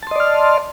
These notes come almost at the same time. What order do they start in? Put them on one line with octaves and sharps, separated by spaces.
A5 C6 D#5 D5 F6